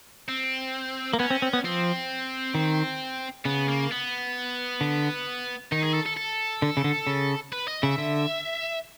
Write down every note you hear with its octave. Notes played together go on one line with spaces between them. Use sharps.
C4
A#3
B3 C#4
C4
C4
B3
F3 C4
D#3
C#3 B3
A#3
B3
D3
D#3 D#4
G#4
A4
A4
A4
D3
C#3
D3
C#3
B4
D#5
C#3 E5
D3